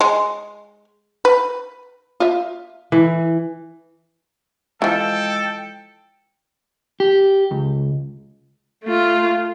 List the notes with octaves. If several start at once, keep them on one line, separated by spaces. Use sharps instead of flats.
G#3
B4
F4 E5
E3
E3 F3 G#3 A4 G5
G4
C#2
A3 F4